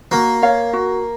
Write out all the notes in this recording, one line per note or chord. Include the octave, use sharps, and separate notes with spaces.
A#3 F#4
C#5 F5
F#4